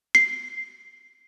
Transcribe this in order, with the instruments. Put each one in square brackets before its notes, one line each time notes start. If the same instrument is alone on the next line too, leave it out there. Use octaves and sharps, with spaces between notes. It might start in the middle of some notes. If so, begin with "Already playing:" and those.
[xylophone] C7